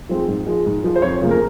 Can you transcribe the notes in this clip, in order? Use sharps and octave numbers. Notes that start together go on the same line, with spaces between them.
F3 G#3 C4
G#2
F3 G#3
G#2
F3 G#3
C5
F2 C#5
C#3 F3 A#3
A#4